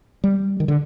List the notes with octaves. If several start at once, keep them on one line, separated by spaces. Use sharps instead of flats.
G3
D#3
D3